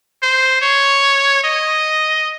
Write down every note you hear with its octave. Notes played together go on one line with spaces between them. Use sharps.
C5
C#5
D#5